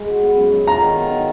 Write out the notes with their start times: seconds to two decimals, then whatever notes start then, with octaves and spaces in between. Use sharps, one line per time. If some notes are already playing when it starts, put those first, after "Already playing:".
Already playing: G#3 B4
0.09 F#4
0.23 B3
0.37 F#2
0.52 F#3
0.67 F4 A#5
0.81 D#3
0.97 B3
1.11 D#4